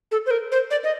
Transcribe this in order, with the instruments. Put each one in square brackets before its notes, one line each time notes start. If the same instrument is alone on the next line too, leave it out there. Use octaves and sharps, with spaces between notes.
[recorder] A4
C5
A#4
C5
D5
D#5